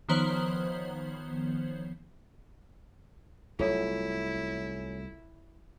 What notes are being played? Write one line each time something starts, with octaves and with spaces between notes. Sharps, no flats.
D#3 F3 B3 C5 C#5 F#7
C2 F#3 A3 C#4 E4 F4 A4 C#5